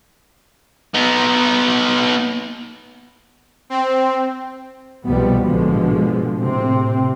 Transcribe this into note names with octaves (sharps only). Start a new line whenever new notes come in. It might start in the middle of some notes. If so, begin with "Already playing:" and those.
B3 D#4
C4
C2 B2 F3 G3 B3
A#1 G#2 B2 D3 F3 G#3
A2 C3 C4